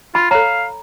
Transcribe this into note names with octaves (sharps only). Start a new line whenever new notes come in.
F4 B5
A4 C#5 F5 A#5